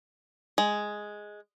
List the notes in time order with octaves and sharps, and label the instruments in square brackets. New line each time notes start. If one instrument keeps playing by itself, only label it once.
[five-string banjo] G#3